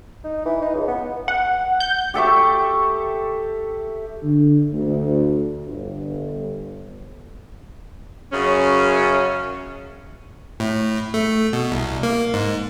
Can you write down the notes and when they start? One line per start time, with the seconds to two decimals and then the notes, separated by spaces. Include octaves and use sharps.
0.24 D#4
0.45 E3
0.62 D#4
0.74 C#2
0.88 B3
1.28 F#5
1.80 G6
2.14 G4 A4 E5 C#6
4.23 D3
4.72 D2
5.67 G1
8.31 F#2 C#3 C#4
10.60 A2
11.14 A3
11.53 B2
11.72 C2
12.03 A#3
12.34 G#2